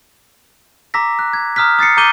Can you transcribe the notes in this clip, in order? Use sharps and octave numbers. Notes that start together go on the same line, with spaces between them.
A#5 D6 E6 A#6 B6
F#6
G#6
A#5 D#6 F6 F#6 B6
D#6 A6 C7 C#7
A#5 D6 G6 D#7 G7